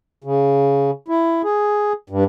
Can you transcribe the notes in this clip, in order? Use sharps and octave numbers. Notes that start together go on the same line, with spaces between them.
C#3
E4
G#4
G2